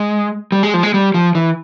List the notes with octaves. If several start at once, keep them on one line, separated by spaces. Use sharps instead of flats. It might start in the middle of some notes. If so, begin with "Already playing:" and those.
Already playing: G#3
G3
G#3
F3
G#3
G3
F3
E3